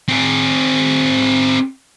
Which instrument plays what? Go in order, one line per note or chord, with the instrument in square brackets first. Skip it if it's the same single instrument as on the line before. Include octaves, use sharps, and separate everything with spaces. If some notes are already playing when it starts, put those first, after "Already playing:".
[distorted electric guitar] C4 G#4